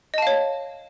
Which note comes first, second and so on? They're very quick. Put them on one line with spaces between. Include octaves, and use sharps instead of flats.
D#5 A5 F5 C#5